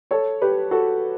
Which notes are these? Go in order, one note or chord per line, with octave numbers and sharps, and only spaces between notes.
A4 C#5
G4 B4
F#4 A4